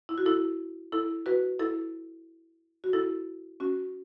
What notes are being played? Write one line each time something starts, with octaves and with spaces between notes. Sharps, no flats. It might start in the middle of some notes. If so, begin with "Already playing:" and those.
E4
F#4
E4 A4
E4 A4
F#4 B4
E4 A4
F#4
E4 A4
C#4 F#4